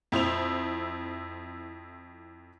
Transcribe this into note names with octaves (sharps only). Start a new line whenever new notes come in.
F2 E4 C5 F7